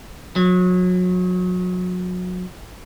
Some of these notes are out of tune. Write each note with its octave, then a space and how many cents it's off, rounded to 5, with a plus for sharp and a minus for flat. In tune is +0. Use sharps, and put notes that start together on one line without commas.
F#3 -30